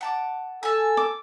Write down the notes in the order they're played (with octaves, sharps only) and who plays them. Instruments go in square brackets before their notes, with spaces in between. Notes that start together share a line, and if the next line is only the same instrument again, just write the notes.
[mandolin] F#5 A5 D6
[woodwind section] A4 E6 [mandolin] G#5 A5
[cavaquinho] D6